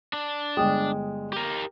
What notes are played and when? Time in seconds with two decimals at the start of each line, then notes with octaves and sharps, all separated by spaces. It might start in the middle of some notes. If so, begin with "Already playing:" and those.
0.13 D4
0.57 G1 G#3 G5 D#6
1.33 G4 A#4